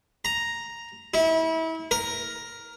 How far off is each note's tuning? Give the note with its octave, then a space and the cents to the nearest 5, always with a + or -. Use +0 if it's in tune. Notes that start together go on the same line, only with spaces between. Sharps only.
A#5 +0
E4 -30
A#4 +5